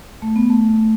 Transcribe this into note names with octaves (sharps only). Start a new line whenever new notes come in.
A3
B3
A3